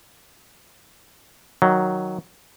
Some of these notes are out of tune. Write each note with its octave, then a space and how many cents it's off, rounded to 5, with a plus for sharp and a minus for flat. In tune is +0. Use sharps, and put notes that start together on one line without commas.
D#3 +0 F#3 +0